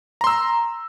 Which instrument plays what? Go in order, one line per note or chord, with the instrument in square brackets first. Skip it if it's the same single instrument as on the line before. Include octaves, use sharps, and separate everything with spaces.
[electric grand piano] A#5
C6
E6